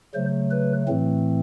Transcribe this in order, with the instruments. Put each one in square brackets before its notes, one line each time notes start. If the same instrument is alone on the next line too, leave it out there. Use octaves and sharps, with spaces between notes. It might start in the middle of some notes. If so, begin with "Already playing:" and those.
[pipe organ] C#3 F#3 A3 C5
B4
A2 E3 A3 C4